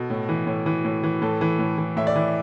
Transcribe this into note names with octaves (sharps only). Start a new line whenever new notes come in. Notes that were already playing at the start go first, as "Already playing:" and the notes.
Already playing: B2 A4
A2
E3
A2
E3
A2
E3
A2 A4
E3
A2
E3
A2 E5
D5
E3